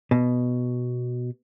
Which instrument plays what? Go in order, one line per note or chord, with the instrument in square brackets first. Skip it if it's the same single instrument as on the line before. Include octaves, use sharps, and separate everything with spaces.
[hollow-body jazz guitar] B2